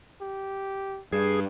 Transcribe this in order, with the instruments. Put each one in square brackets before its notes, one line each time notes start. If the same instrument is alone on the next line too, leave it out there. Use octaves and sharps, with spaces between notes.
[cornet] G4
[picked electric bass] G2 [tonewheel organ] G#4